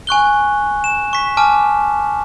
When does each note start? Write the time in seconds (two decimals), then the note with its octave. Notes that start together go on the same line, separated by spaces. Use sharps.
0.07 G#5 C#6 F#6 G7
0.84 E7
1.13 C#6 B6
1.37 G#5 A5 D6 F6